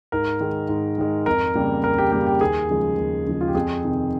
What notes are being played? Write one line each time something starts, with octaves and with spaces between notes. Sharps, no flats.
G#2 A#4
D#3 G#3
G#2
D#3 G#3
F2 A#4
C#3 G3 A#3
F2 A#4
G4
C#3 G3 A#3 G4
G4
D#2 G#4
C#3 F3 G#3
D#2
C#3 F3 G#3
F4
G4
F2 G#4
C3 D#3